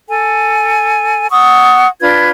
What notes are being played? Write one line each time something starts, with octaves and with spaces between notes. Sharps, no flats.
A4 G#5
F#5 C#6 D#6 E6
D4 F4 B4 G#6